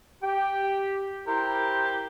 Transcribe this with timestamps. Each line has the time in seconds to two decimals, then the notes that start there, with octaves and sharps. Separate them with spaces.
0.23 G4 G5
1.27 E4 G4 A#4 C5